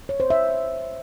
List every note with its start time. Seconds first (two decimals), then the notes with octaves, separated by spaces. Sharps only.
0.09 C#5
0.20 C5
0.30 E5